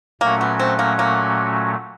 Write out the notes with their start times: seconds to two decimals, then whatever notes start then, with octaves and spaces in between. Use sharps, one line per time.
0.21 A#2 F#3 A3 A#3 C#4 F#4
0.41 B3
0.59 C4
0.79 A#3
0.99 A#3